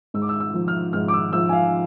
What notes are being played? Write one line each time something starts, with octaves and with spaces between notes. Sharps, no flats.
G#2 E6
D6
E6
E6
F3
F6
G#2 F6
D6
E6
F3 E6
G#5
F5